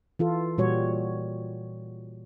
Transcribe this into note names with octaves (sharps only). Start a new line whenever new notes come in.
E3 F4 A4
A#2 G3 F#4 C#5